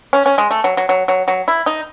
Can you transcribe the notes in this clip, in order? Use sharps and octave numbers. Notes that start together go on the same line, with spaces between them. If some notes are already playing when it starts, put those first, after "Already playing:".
C#4
C#4
G#3
A3
F#3
F#3
F#3
F#3
F#3
E4
D#4